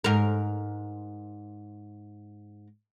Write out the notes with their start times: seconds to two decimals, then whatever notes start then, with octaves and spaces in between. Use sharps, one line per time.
0.04 G#2 A#4